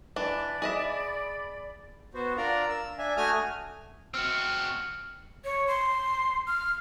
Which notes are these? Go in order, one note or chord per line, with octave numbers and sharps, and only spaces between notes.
E3 D4 D5 B5
G#4 D#5 E5
B3 F#4 C5
D4 F4 A#4 D5 A#5
E6
D4 E5 G#5
A3 F#4 G#5 D#6 F6
C4 F#4 E6 F6 C#7
C#5
C6
F6